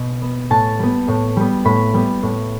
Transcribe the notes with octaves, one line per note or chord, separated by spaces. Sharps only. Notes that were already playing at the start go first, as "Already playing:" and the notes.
Already playing: B2
B3
A2 A5
G3 B3
A2
G3 B3
A2 B5
G3 B3
A2